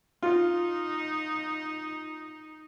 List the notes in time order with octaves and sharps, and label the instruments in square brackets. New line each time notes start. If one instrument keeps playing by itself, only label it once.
[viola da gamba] D#4 [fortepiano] F4